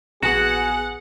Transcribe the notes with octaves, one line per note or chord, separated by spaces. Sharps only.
A#1 B3 F#4 G#4 F#5